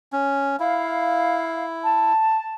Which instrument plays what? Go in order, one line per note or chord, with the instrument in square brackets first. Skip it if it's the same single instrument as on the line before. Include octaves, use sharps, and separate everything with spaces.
[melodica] C#4
[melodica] E4 [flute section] F5
[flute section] A5